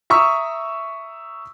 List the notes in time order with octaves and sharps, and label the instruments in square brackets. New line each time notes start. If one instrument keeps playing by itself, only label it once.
[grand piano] E5 A#5 C#6 D#6 E6